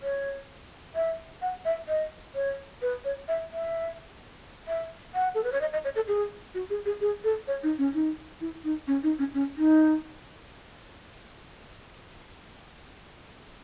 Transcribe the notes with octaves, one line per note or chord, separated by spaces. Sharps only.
C#5
E5
F#5
E5
D#5
C#5
B4
C#5
E5
E5
E5
F#5
A4
B4
C#5
D#5
D#5
C#5
A4
G#4
F#4
G#4
G#4
G#4
A4
C#5
D#4
C#4
D#4
E4
D#4
C#4
D#4
C#4
C#4
D#4